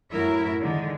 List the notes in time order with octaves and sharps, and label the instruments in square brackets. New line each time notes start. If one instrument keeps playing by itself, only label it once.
[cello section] F#2 A2 F#3 E4 A#4 E5
D3 D#3 G#3